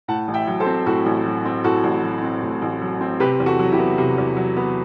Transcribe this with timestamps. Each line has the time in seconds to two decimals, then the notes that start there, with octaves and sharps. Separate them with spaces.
0.08 A2 F#5 A5
0.28 A1
0.34 E5 G5
0.47 F#3
0.60 A4 C5
0.66 C4
0.86 A2 F#4 A4
1.06 A1
1.26 F#3
1.45 C4
1.64 A2 F#4 A4
1.84 A1
2.03 F#3
2.22 C4
2.42 A2
2.62 A1
2.81 F#3
3.01 C4
3.20 C3 G4 B4
3.40 E2
3.46 F#4 A4
3.59 F#3
3.72 E4 G4
3.78 B3
3.98 C3
4.18 E2
4.36 F#3
4.56 B3